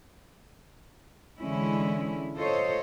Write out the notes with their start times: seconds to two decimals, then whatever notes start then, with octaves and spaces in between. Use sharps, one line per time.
1.39 D3 E3 G#3 C#4 E4
2.36 F4 A4 C5 C#5 D#5